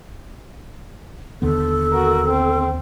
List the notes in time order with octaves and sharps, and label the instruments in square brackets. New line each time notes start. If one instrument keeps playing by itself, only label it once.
[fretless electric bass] D#2 D3 B3 [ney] A4
[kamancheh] F#4 A#4
C4